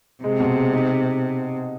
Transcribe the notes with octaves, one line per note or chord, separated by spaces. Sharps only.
C3 G#3
B2
G#3
D#4